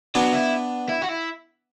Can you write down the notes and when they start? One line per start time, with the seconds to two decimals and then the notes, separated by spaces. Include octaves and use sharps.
0.15 F#3 B3 D4
0.33 E4
0.89 E4
1.02 F#4
1.09 E4